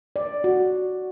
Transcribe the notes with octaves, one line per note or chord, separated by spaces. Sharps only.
D5
F#4